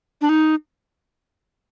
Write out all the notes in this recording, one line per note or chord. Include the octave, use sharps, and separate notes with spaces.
D4
D#4